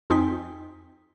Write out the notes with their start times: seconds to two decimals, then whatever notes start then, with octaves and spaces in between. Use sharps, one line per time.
0.10 F2 C4 D#4 G5 G#5 B6